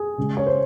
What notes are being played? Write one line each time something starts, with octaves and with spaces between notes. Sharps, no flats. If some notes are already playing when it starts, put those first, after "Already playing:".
Already playing: G#4
C#3 G#3
C#5
C5